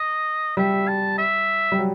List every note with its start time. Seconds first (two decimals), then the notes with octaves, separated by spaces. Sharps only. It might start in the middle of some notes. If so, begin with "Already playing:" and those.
Already playing: D#5
0.57 G3 E5
0.88 A5
1.18 E5
1.72 G3
1.79 F#3